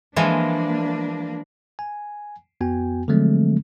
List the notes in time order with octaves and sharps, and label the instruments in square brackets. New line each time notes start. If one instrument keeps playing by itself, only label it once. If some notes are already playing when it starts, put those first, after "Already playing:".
[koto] E3 F3 G#3 [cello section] A#3 D4
[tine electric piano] G#5
F2 B3 F#4 G5 G#5
D3 F3 F#3 G#3 A3 C4